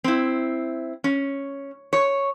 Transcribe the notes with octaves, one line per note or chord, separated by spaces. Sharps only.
C4 E4
C#4
C#5